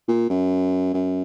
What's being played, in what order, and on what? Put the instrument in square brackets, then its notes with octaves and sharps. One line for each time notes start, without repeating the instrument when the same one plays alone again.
[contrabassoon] A#2
F#2
F#2